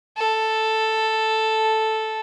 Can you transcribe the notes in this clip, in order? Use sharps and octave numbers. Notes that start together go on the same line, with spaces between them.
A4